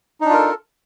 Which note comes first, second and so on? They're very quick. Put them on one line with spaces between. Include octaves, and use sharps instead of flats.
D#4 D4 F4 A#4 A4